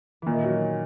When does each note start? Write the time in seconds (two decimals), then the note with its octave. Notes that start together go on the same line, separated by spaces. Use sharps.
0.22 A#2 D#3 E3
0.44 F#3